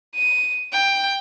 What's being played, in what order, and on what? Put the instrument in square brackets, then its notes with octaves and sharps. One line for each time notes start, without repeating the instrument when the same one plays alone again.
[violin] D#7
G5